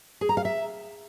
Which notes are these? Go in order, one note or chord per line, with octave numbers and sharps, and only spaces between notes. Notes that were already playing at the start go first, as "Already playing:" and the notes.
G#4
A#5
F5
E5